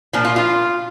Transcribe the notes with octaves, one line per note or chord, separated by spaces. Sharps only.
A#2 F3 A#3 D4
F4
F4